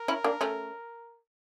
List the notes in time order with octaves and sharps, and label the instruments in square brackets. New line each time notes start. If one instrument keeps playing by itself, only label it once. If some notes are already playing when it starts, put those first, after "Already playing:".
Already playing: [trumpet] A#4
[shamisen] C#4 E4
A#3 D4
A3 C#4